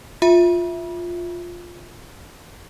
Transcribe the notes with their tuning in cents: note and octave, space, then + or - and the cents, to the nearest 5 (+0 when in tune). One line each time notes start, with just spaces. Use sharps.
F4 +5 E5 +0 B5 -35